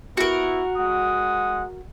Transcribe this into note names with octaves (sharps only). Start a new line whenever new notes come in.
B3 E4 F#4 A#4
G#3 F#5 D#6